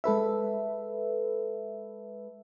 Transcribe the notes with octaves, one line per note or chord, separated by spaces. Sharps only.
G#3 A4 B4 E5